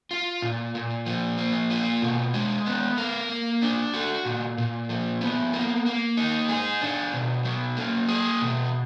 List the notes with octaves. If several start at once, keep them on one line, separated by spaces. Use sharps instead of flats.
F4
A#2
A#2
F3
A#3
F4
B2
G#3
B3
A#4
A#3
D4
F#4
A#2
A#2
F3
B3
A#3
A#3
D#4
G#4
D4
B2
F#3
A#3
G#4
B2